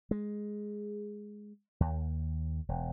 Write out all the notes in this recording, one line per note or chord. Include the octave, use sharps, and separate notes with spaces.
G#3
D#2
E1